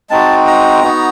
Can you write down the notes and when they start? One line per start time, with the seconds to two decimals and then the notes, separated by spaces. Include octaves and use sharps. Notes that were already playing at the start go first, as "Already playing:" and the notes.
0.10 G#3 C4 D#4 F#4 A5
0.47 A#5
0.83 B3 D#4 F#4